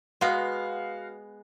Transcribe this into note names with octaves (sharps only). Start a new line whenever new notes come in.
G#3 B3 F#4 F5